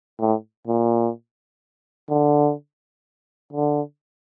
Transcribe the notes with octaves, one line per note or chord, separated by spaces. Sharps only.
A2
A#2
D3
D3